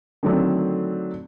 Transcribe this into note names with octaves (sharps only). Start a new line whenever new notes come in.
D3 D#3 F#3 A3 C4 D4